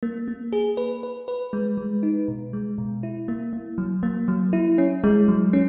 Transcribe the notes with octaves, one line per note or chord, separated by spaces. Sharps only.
A#3
A#3
G#4
B4
B4
B4
G#3
G#3
D#4
B2
G#3
B2
E4
A#3
A#3
F#3
A#3
F#3
E4
C#4
G#3
F#3
C#4